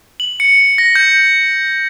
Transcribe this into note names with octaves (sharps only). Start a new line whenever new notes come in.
F#7
C#7
A#6
G6